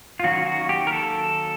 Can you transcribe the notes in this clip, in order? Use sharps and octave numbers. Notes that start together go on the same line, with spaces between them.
F4
D#3 F#3 A#3 C#4 F#4
F#4
G4
A#4
A4